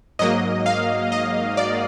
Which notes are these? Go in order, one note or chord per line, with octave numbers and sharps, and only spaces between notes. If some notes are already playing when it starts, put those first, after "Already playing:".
G#2 F#3 A#3 D#5
F5
D#5
D5